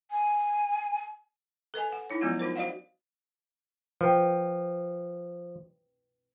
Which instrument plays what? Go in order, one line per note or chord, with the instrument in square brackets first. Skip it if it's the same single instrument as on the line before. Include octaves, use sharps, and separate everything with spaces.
[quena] G#5
[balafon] A4 B4 D#5 G#5
F#5
D#4 E4 C#5
F3 F#3 G#3 B3 C#4 F4
D#4 F4 A#4 C5
F#4 C5 D5 D#5 F5 F#5
[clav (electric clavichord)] F3 [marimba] B4 G5